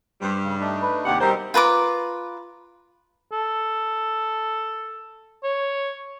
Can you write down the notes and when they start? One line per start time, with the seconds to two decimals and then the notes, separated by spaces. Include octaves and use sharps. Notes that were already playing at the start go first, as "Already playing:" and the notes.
0.21 G2 G3 C5
0.44 C#3
0.60 A3 D4 D#4
0.82 B4
1.06 D#2 C3 G4 F#5
1.21 B2 G3 C4 D#4 A#4 C5
1.54 F4 B4 A#5 D6
3.32 A4
5.43 C#5